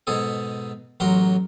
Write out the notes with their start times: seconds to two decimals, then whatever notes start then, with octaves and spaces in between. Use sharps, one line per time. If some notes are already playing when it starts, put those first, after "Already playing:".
0.07 G#2 B2 G#4 A4
1.00 A1 F#3 F#4 A#4 C6